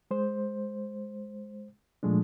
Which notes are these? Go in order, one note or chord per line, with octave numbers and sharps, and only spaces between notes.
G#3 C5
A#2 F3 G#3 A3 D4